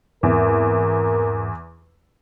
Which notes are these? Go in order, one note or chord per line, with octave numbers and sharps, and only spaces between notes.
E2 G#2 C4 A#4